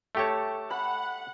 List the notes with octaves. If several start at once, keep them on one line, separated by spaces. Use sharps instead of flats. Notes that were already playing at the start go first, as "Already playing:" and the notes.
A3 G4 A4 C#5 G5 A5
F#5 B5